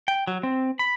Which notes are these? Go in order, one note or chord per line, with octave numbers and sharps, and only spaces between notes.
G5
F#3
C4
B5